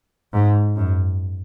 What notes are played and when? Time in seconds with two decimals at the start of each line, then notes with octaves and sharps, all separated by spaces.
0.33 G#2
0.76 F#2